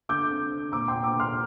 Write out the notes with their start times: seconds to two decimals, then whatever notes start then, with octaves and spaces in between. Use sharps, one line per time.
0.09 D3 D6 G6
0.30 C4
0.51 C4
0.72 A#2 A#5 D6
0.88 G5 C6
0.94 A#2
1.04 A#5 D6
1.14 A#2
1.20 C6 F6